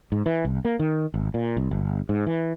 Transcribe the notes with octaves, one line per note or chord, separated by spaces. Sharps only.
G#2
E3
C2
A#3
D#3
G#1
A#2
C2
G1
G#2
E3